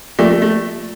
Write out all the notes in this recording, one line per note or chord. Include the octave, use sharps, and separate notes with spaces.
F3 A3 A#3 F4 A#4 D5
A3
A3